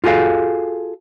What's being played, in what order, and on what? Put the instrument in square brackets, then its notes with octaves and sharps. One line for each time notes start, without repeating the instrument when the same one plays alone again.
[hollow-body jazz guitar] F4 F#4 G#4 A4 F5